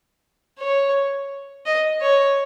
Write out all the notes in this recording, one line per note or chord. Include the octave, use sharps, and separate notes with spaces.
C#5
D#5
C#5